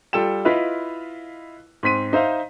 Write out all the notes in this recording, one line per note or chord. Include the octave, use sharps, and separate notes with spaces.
G3 F4 A4 G5 E7
E4 F4 B4 D#5 F5
G#2 C4 B6 D#7
D#4 C5 E5 F5